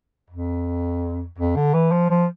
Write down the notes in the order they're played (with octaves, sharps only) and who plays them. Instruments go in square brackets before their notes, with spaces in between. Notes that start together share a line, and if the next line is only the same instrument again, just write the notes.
[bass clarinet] F2
F2
D3
E3
F3
F3